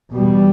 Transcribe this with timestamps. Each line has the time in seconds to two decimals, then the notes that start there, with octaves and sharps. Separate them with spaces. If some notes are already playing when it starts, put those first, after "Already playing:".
0.14 E2 B2 G3